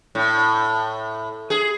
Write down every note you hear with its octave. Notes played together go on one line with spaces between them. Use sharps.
A2
G#4